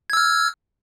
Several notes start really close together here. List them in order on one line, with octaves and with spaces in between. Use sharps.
G#6 E6 F6